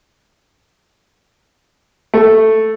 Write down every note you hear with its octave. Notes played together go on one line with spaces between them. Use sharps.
A3